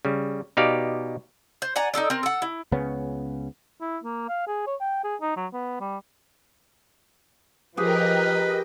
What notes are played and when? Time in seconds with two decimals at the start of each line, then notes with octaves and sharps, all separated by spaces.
0.05 C#3 G3
0.57 B2 D#4 G4 D5 F5
1.62 C5
1.76 D5 F#5 G#5 A#5
1.94 D#4 E4 A4 D5
2.10 C4 A#4
2.23 A4 F#5
2.42 E4
2.72 C#2 C#3 B3 C#4
3.81 E4
4.04 A#3
4.29 F5
4.47 G#4
4.67 C#5
4.81 G5
5.04 G#4
5.21 D#4
5.37 F#3
5.53 B3
5.81 G3
7.77 F3 G4 G#4 A#4 B4 D#5 G5